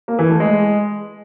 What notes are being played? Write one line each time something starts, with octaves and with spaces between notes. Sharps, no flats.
A#3
E3
A3
G#3